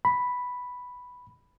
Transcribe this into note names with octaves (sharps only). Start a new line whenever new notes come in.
B5